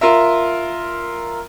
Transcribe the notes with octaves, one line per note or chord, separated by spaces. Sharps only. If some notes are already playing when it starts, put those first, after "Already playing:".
F4 A#4 E5